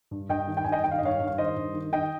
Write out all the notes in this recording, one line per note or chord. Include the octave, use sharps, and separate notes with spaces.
G2
G2 D#5 G5
D#3
G5
G2 G#5
D#5 G5
D#3 G5
F5
D#5
G2 C#5 F5
G2
F5
D#3 C5 D#5
G2
D#3
D#3 D#5 G5